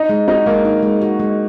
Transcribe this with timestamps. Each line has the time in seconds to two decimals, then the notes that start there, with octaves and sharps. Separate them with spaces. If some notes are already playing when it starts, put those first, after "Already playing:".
Already playing: D#4
0.09 G#3
0.28 D#4 F#4
0.46 G#3 A#3
0.65 D#4
0.83 G#3
1.01 F#4
1.20 G#3